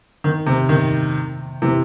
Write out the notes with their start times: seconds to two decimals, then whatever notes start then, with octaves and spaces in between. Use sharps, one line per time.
0.24 D#3
0.46 C3
0.69 D#3
1.62 C3 E3